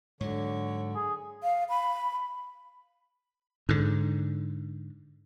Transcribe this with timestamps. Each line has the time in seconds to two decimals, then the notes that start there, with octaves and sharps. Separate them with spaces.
0.21 G#2 D3 F#3 C#5
0.96 G#4
1.43 F5
1.69 B5
3.69 G#2 D3